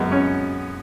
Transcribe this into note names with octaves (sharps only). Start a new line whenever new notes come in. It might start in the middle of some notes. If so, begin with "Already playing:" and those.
Already playing: F#2 G#3 B3
C#4